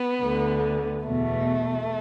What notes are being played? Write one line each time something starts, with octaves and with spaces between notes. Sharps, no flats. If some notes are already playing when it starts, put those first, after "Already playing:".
Already playing: B3
D2 D3
E2 B2 A3